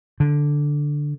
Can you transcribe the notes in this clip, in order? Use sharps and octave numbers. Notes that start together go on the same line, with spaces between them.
D3